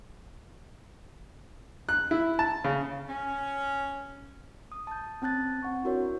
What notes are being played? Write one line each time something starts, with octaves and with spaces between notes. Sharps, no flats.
F#6
E4
A5
C#3
C#4
D#6
A5 G6
C4 C#4 A5 F#6 A6
C4 F#5 C#6
D4 E4 F#4 A#4 C#5